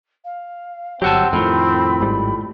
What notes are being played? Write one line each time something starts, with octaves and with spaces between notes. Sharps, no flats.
F5
G1 F#3 C4 G4 F#5 A5 E6
F2 A2 D#3 F4 B5
G#1 G#2 G3